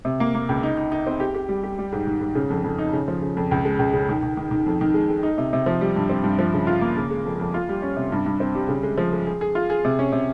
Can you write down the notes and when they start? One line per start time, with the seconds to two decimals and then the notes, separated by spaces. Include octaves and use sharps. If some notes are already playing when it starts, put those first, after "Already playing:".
0.05 C3
0.20 A#3
0.35 A#3
0.49 C#2
0.63 D#4
0.77 D#4
0.92 D#4
1.07 C4
1.20 G4
1.34 G4
1.49 G3
1.63 G4
1.79 G3
1.92 G#2
2.07 D#3
2.21 G#2
2.35 C#3
2.50 F2
2.64 F2
2.78 D#4
2.93 C#3
3.08 F3
3.22 C#3
3.37 F2
3.51 C#2
3.65 G#3
3.79 C#2
3.93 C#3
4.09 D#3
4.23 D#3
4.37 D#3
4.51 D#3
4.66 F2
4.81 D#3
4.94 G#3
5.10 G#3
5.23 D#4
5.38 C3
5.53 C3
5.66 F3
5.81 G3
5.96 G2
6.10 C4
6.24 G2
6.39 F3
6.54 C#3
6.67 F4
6.81 A#3
6.97 C#3
7.11 G#3
7.25 F2
7.40 F2
7.54 F4
7.69 G3
7.82 C#4
7.97 C3
8.12 G2
8.26 G2
8.40 C4
8.55 G3
8.69 C#3
8.83 G#3
8.98 F3
9.13 G#3
9.27 G#4
9.41 G#4
9.55 F4
9.70 G#4
9.85 C3
9.99 C#4
10.12 C3